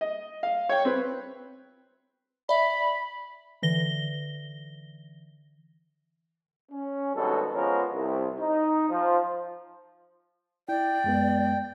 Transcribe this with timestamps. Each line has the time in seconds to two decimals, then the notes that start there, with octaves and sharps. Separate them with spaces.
0.01 D#5
0.43 F5
0.69 C#5 G5
0.85 C4 B4
2.49 D5 E5 B5
3.62 D3 E3 A#6 G7
6.71 C#4
7.15 G#1 G2 B2 F#3 A4
7.53 F3 G#3 B3 C#4 A#4
7.93 C2
8.40 D#4
8.90 F3
10.69 E4 D5 G5
11.04 F#2 G#3 B3